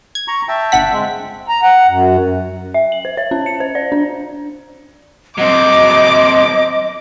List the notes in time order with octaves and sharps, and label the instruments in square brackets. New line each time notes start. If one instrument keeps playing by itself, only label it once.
[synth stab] G#6
[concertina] A#5 C#6
E5 G5 A5
[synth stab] G1 F#5 B6
[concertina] G#3 C4
[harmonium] A#5
F#5
F#2
[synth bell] E5
F#7
C5
C#5
C#4
C#7
C5
D5
D4
[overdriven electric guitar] F#3 C4 [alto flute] D#5 [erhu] D6